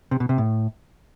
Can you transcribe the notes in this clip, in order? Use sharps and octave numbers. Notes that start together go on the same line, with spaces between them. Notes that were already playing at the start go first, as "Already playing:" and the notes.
C3
B2
C3
A2